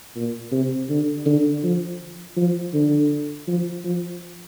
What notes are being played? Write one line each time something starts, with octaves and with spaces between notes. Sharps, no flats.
A#2
C3
D3
D3
F3
F3
D3
F3
F3